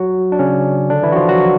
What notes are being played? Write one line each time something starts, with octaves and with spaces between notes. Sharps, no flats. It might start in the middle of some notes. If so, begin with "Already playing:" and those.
Already playing: F#3 F#4
D4
C#3 C#4
D3 D4
E3 E4
F#4
F3 F4
F#3 F#4